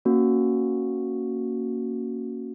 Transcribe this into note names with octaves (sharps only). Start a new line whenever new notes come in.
A#3 C#4 F#4